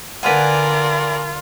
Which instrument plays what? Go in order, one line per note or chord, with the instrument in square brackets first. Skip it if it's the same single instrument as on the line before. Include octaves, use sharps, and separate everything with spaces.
[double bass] D3 [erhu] F4 [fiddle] A#4 D5 [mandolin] B4 F#5 G#5